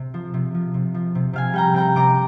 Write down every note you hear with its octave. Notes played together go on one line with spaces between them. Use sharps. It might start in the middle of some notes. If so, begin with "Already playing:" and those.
Already playing: C3
F3
C3
F3
C3
F3
C3
C3 F5 G#5
G3 G5 A#5
C3 G5 A#5
C3 A#5 D6